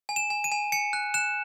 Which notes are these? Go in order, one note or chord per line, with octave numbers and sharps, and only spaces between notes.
G#5
E7
G#5
D#7
G#5
G#5 C#7
F#6
F#6 E7